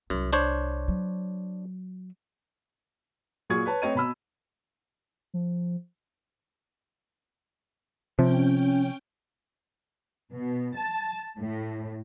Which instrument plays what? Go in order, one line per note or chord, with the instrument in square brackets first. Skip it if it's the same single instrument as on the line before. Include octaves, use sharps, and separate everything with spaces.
[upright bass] C2 [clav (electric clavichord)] F#2
[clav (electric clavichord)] D4 C5 C#5
[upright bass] F#3
[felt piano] A#2 F#3 F4 G#4 C#6 G#6
B4 C#5 A5
A3 C4 B4 C#5 D#5 D#7
B2 B5 E6
[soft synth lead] F3
[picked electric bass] C3 F3 [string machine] C#4 G5
[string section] B2
A5
A2